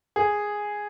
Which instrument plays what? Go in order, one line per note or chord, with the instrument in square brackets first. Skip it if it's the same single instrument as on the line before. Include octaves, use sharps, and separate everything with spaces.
[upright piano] G#4